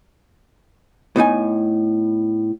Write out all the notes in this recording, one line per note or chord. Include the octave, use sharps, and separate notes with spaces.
A2 B3 D#4 G#5